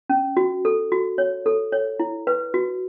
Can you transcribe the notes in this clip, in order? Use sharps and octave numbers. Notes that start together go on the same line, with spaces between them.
C#4
F#4
A4
F#4
C#5
A4
C#5
E4
B4
F#4